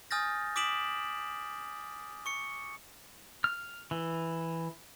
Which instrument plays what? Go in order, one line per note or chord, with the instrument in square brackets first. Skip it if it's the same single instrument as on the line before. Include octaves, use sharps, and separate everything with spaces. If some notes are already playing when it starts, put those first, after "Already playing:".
[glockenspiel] G#5 D#6 F6 G6 A6 A#6
D6 D#6 B6 D7 E7 F#7
C#6 C#7
[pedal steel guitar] F6
E3